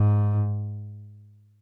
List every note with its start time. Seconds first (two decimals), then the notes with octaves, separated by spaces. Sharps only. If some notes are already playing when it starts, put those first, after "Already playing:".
Already playing: G#2